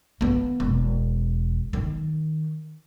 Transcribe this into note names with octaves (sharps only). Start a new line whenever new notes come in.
A#3 B3
E1
D#3